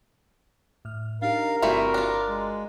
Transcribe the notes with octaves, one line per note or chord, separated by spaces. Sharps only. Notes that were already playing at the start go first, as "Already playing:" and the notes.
A2 F6
D4 D#4 G4 A#4 F5
G1 C3 E3 G3 A3 F#4 C6
D4 F4
G#3